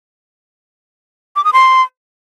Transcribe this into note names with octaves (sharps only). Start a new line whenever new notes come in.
D6
D#6
C6